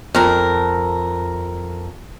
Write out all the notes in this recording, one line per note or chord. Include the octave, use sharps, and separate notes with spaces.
F2 A#4